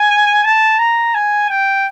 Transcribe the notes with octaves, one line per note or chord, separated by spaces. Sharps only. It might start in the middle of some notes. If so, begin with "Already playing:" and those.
Already playing: G#5
A5
A#5
G#5
G5